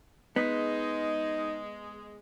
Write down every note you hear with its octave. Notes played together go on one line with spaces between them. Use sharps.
G#3 B3 D#4